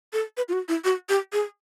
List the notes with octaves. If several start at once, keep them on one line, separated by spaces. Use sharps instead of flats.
A4
B4
F4
F#4
E4
F#4
G4
G#4